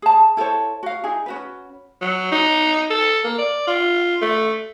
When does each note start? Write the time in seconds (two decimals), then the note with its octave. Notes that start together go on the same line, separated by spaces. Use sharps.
0.02 G#4 A5
0.37 E4 A4 C5 C#5
0.83 F#4 F5
1.04 D#4 E4 G#4
1.26 C#4 F#4 B4
2.01 F#3
2.32 D#4
2.90 A4
3.24 A#3
3.38 D5
3.67 F4
4.22 A3